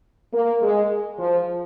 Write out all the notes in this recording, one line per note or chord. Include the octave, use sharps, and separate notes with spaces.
A#3
G#3
F3